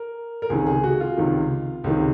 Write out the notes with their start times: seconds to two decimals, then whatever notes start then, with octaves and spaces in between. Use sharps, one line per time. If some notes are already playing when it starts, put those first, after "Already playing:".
Already playing: A#4
0.42 A#4
0.50 C#2 C3 D#3 G#4
0.67 G#4
0.84 F#4
1.00 F4
1.17 C#2 C3 D#3
1.84 C#2 C3 D#3